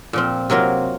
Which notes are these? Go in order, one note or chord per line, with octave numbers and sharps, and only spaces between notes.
A#2 F3 C4
C3 F#3 A#3 F4 A#4